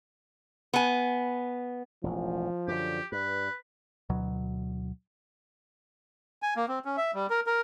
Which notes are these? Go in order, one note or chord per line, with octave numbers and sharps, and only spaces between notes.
B3 G#5
E1 A1 F3
F#2 D3 G4
G2 B4
D2 B2 F#3
G#5
A#3
C4
C#4
E5
G3
A#4
A#4